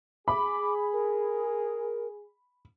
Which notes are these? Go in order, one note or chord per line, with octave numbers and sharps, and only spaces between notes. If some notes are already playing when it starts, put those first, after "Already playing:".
G#4 B5 D6
A#4